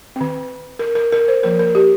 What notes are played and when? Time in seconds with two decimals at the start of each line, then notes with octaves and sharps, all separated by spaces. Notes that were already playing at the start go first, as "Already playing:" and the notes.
0.16 D#3 C4
0.79 A#4
0.95 A#4
1.12 A#4
1.28 C5
1.43 F3 A#3 A#4
1.59 A#4
1.75 G4